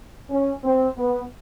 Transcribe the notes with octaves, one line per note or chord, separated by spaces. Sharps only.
C#4
C4
B3